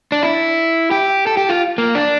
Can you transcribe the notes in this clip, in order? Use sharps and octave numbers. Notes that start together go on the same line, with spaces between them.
D4
E4
G4
A4
G4
F4
A#3
D4